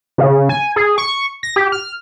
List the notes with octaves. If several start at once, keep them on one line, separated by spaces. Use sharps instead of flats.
C#3
G#5
G#4
C#6
A#6
G4
F6